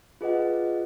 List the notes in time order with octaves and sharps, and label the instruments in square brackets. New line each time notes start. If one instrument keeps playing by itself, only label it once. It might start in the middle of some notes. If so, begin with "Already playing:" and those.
[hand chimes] F4 G#4 B4 D#5 F#5